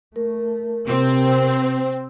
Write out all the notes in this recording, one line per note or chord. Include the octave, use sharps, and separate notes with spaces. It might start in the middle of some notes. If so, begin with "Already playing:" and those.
A3 A#4
C3 C4